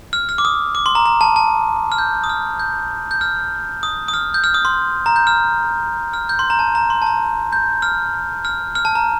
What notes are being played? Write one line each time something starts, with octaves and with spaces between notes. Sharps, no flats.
F6
F6
D6
D#6
D6
C6
A#5
A#5
A5
A5
F6
G6
D#6
F6
G6
G6
F6
D#6
D#6
F6
G6
F6
D#6
C6
A#5
G6
F6
F6
G6
C6
A#5
A5
A#5
C6
A5
A#5
G6
F6
F6
F6
A5
A#5